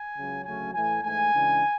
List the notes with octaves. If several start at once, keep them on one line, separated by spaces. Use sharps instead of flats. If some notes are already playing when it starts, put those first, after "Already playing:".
Already playing: G#5
C#2 C#3 F#3
D2 C#3 F#3 A3 C#4 G#5
A2 E3 A3 G#5
G#2 E3 A3 G#5
C#3 E3 G#3 D4